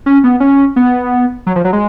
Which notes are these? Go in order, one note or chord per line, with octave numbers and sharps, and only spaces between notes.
C#4
B3
C#4
B3
F#3
F3
F#3
G#3